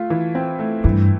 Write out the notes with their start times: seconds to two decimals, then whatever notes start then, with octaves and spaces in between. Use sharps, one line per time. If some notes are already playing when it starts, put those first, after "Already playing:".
Already playing: A3 F4
0.10 E3
0.35 C4
0.59 A3
0.84 G2 E3